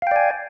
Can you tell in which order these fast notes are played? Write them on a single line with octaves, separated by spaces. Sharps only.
F5 G5 D5 G#5